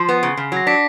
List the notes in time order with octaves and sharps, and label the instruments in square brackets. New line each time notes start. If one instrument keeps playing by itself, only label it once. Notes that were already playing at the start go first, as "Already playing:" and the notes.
Already playing: [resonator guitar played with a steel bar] F3 [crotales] C7
[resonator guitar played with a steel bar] B3
C#3
C#3
[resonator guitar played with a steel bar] F#3 [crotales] A#6
[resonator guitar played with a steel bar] D4 [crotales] B6